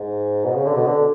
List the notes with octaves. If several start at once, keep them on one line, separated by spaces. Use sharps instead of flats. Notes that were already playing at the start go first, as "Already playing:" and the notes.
Already playing: G#2
B2
C#3
D3
B2
D3